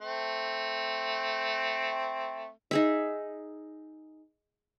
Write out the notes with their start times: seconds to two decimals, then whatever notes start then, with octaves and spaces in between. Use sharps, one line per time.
0.01 A3 C4
2.71 D#4 G#4 E5